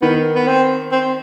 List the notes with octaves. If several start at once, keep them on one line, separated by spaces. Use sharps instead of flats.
D#3 B3
B3
C4
C4